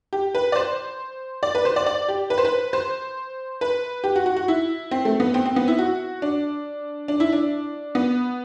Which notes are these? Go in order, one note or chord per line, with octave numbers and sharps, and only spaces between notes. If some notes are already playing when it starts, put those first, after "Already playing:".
G4
B4
D5
C5
D5
B4
C5
D5
D5
G4
B4
C5
B4
C5
B4
G4
F#4
F#4
F#4
E4
C4
A3
B3
C4
C4
B3
E4
F#4
D4
D4
E4
D4
B3